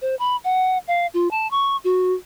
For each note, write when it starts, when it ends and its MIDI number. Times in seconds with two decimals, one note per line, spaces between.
0.02 0.15 72
0.19 0.37 83
0.44 0.78 78
0.88 1.07 77
1.14 1.30 65
1.31 1.49 81
1.51 1.77 85
1.84 2.14 66